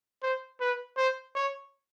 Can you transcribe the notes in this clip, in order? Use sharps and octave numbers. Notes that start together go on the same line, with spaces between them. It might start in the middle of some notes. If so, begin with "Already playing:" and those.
C5
B4
C5
C#5